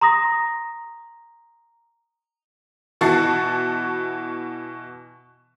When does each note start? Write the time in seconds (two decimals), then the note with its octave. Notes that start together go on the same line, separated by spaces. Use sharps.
0.01 A#5 C6 D#6 A#6
3.01 B2 E3 F#4 A5 A6 C7